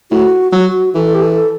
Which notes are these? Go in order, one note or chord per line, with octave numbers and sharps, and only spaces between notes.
A2 F#4
F#3 F#4
E3 A4
G4
A4